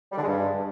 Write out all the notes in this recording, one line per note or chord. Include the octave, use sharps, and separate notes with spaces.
G3
D3
G#3
G2